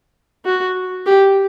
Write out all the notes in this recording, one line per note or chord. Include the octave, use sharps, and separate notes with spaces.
F#4
G4